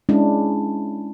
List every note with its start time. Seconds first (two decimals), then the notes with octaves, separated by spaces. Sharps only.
0.09 G#3 C#4 D4 E4